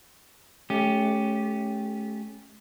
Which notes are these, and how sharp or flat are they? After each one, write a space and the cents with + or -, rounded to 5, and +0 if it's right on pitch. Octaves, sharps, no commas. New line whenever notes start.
A3 -35 C#4 +0 G4 +0